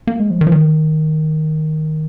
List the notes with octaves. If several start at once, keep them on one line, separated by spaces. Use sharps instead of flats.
A#3
G#3
F3
D#3
F3
D#3